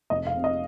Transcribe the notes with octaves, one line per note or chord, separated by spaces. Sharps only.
F1 D#5
F5
C3
D#5